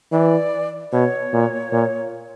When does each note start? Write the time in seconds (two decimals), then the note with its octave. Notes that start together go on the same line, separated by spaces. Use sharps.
0.12 E3 D5
0.92 B2 C#5
1.33 A#2
1.72 A#2